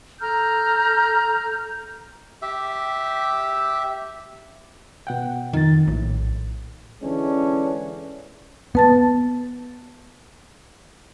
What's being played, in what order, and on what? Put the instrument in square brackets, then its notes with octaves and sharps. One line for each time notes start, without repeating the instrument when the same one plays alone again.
[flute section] A4 A#5 F6 G6
[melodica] G4 E5
[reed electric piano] B2 F#5 G5
[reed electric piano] F2 A6 [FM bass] D#3
[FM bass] A#1 [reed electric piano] A2
[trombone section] D3 E3 G#3 C#4 D4
[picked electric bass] B3 [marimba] B4 A5 A6